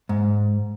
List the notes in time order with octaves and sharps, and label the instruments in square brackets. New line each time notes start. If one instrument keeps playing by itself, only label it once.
[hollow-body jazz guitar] G#2